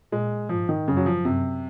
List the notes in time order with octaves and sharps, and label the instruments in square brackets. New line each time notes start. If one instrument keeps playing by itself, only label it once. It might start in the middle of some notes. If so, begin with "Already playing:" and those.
[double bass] A#2 [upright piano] G#3
[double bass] G#2 [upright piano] F3
[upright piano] D#3
[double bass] F#2 [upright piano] C#3
[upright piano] F#3
F3
[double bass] F#2 [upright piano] C3